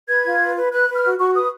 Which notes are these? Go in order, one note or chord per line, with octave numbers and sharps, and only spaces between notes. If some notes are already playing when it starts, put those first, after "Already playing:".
B4 G#6
F4
B4
B4
B4 F#6
B4
F6
F#4
F#4 C#6
B4 D#6